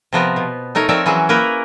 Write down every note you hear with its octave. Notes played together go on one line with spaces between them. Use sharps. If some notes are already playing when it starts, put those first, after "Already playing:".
C3 F3 B3 A#4
B2
A3 D#4 A#4 C#5
F3 C4 A#4 C#5 D5 E5
E3 F#3 C#4 G#4
A#3 E4 A#4 B4